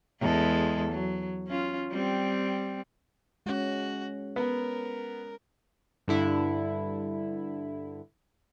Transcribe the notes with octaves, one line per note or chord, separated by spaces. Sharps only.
E2 G#3 A4
F#3
C#4 F4
G3 C4
G#3 C#4 F#4
B3 A#4
G2 D3 E4